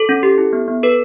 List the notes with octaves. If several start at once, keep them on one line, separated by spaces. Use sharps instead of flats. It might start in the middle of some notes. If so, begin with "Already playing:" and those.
Already playing: A4
C#4
G4
E4
B3
B3
A4 B4